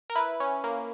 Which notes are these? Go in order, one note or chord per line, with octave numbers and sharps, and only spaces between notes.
A#4
E4 B4
C#4
A#3